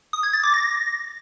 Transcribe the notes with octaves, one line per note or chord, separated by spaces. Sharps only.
D#6
G#6
A6
D6
A#6